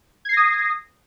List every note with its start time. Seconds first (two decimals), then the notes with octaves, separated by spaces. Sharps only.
0.25 G#6
0.29 C7
0.33 A#6
0.37 D#6